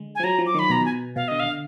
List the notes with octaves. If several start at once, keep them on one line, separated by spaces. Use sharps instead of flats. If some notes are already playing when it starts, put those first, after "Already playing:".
Already playing: D3 G#3
G#5
F3
F#3 A#5
F3
D6
D#3 B5
B2 A#5
G#5
B2 F5
D3 D#5
F5
D3